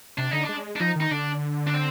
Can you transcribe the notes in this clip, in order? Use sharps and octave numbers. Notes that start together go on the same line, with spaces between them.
C3 D4
D3 D#4
G#3 D4
D4
F3 D#4
D#3 D#4
D3 D4
D4
C4